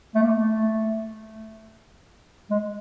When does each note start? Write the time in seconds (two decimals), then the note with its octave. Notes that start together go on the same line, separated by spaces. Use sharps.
0.15 A3
0.23 A#3
0.30 A3
2.50 G#3